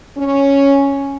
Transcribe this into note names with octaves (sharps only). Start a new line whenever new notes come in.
C#4